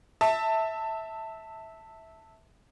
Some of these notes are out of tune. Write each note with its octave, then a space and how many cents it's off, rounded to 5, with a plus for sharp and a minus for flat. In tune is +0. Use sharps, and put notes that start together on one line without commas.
E5 -15 A5 +15